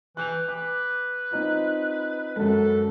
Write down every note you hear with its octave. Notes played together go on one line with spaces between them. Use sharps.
E3 F#6 G6 F7
B4 D6
C4 D#4 F4
F#2 D3 G#3 A4